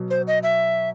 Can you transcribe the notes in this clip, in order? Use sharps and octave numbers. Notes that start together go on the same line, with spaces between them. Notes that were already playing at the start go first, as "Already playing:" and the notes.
Already playing: B2 F#3
C5
D#5
E5